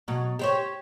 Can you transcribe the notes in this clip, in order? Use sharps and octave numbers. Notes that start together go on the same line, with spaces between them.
B2 F#3
G4 C5 C#5